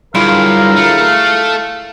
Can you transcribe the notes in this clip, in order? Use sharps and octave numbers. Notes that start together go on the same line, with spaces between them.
G2 D3 F#3 E4 F4 G#4 A#4 F5
A3